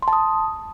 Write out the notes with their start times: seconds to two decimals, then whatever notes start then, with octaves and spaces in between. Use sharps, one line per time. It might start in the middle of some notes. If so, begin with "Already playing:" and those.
0.02 C6
0.08 A5
0.13 D#6